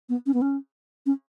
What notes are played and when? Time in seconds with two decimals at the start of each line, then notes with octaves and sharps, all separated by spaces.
0.09 B3
0.26 C#4
0.34 B3
0.42 C#4
1.06 C#4